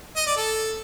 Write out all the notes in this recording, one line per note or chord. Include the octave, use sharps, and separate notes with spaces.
D#5
D5
A4